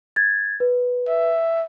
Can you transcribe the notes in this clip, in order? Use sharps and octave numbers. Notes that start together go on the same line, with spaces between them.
G#6 A6
B4
E5